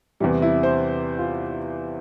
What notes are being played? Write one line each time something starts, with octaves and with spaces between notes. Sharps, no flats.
E2 C3 E3 G3
E4
C5
F4